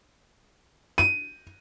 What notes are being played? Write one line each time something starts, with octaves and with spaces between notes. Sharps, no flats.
D#7